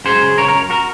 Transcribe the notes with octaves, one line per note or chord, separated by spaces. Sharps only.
F#2 G#4 C5
C#3
C#3 A#4 C#5
A#4 C#5
F#2
F#4 A#4